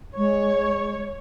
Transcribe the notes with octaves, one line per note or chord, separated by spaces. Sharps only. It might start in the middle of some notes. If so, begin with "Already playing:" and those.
G#3 C#5